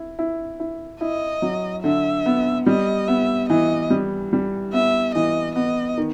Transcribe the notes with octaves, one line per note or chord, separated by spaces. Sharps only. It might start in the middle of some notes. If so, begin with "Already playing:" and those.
Already playing: E4
E4
E4
E4 D#5
F#3
D3 E5
B3
G3 D#5
B3 E5
E3 D#5
G3
G3
B3 E5
E3 D#5
B3 D#5
D#3